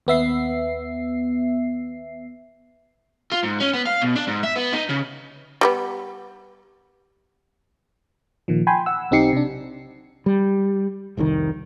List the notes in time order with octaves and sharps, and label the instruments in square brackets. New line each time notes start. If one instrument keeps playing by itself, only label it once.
[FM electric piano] D#2 B3 E5 C7
[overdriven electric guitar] F4
G#2
C#4
B3
F5
B2
D4
G#2
E5
B3
D#4
C#3
[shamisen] G3 A#3 B3
[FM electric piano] A#2 D#3 F3
G5 G#5 B5 C6
F#5 E6
B1 C4 D#4 G4 C7 C#7
C3 D4
[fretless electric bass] G3
F1 C2 C3 D#3